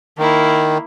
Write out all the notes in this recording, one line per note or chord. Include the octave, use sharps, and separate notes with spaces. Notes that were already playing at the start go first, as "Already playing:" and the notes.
D#3 A#3 E4